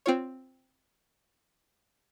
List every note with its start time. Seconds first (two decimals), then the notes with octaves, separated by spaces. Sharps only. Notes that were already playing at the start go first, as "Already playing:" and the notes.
0.06 C4 F4 C#5